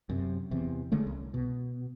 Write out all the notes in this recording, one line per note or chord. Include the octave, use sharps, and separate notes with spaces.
F#2 C3
E2 C3
D3 G#3 A3 C#4
C2
B2